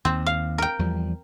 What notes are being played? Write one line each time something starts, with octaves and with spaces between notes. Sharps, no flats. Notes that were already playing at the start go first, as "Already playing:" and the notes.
D#2 C4
F5
A#4 G5
E2 F3 G3